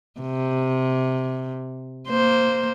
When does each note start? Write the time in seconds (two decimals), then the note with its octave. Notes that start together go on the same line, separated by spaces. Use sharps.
0.21 C3
2.08 A#3 C5